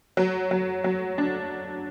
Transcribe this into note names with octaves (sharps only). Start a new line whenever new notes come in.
F#3
F#3
F#3
D4